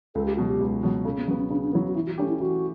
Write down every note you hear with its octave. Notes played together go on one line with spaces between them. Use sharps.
C#2 A4
G4
B2 F#3 F#4
G4
C#2
B2 F#3
C#3 A4
B3
F#3 B3 C#4
C#4
C#3 D4
D4
F#3 B3 E4
F#4
E3 E4
F#4
A3 C#4 D4 G4
E4
E3 F#4